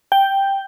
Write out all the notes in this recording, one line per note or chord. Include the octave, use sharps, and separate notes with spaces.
G5